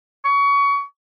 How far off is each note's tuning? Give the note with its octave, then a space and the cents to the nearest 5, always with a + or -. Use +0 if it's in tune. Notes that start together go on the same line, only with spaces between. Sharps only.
C#6 +25